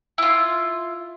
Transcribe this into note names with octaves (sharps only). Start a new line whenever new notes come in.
E4 F4